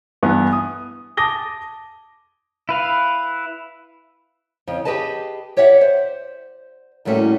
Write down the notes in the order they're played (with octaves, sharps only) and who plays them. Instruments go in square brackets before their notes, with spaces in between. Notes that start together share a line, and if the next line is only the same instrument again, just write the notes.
[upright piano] G2 E3 B3
D#6
A5 D6 D#6 A#6 G7
[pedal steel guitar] E4 B4 F5
[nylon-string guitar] F2 C#3
G4 G#4 B4 D#5 A5
G4 C#5 D5 E5 F#5
C5
A2 F#3 G3 A3 A#3 C#4